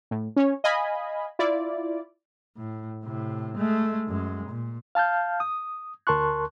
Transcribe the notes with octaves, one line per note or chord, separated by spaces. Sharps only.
A2
C#4 C#5
D#5 F5 G#5 B5
E4 F4 D5
A2
A2 C3
G#3 A3
F#2 G#3
A#2
F5 A5 F6 G6
D#6
D2 A#4 A5 C6 C#6 F#6